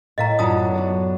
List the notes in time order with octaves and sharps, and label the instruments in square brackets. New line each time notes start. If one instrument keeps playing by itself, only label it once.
[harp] A2 [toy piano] D#5 F5 A#5
[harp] F#2 F#3 D4 [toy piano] F4 A5 D#6
[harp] B3
B3 D4